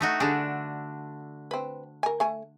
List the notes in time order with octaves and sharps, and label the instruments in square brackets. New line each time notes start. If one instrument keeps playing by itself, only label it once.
[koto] A3 D#4 F#4
[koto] D3 D4 [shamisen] G3 G#4
[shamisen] C4 B4
A#4 G#5
A3 G#5